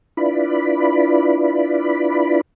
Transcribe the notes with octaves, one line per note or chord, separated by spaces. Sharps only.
D4 E4 F4 B4 D5 B5